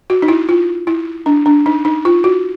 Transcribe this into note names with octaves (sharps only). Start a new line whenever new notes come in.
F#4
D#4
E4
F4
E4
D4
D4
D#4
D#4
F4
F#4